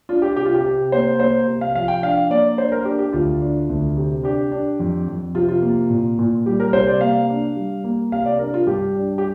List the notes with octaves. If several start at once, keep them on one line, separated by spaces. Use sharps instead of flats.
D4 F4
G4
C3 G4
F4
G4
C3
A#3 C5
A#3 C5
C3
F5
F3 F5
G5
D4 F5
A#3 D5
D4 C5
A#4
D4 G4
G4
D2 F4
D4
D2
C3
D4 G4
D4
F2
F2
C3 F4
F4
A#3
A#2
A#2
G3 G4
A#4
C3 C5
D5
A#3 F5
D4
G3
A#3
C3 F5
D5
D4 A#4
F4
G2 G4
D4
G4